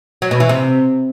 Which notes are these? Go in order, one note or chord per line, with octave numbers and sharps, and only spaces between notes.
F#3
B2
E3
C3